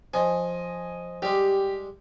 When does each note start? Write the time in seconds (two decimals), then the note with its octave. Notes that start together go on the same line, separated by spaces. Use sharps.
0.14 F3 D#5 G#5
1.22 G3 G#3 G4